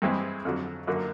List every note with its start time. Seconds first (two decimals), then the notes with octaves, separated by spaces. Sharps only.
0.02 G2 E3 G#3 C4 E4
0.45 F2 D3 F#3
0.87 F#2 D3 F#3 A#3